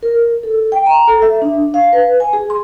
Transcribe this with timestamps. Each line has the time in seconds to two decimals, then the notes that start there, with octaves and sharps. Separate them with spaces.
0.03 A#4
0.43 A4
0.72 G5
0.86 A#5
1.08 A4
1.22 E5
1.42 D4
1.74 F5
1.93 B4
2.20 G#5
2.33 G#4
2.50 C6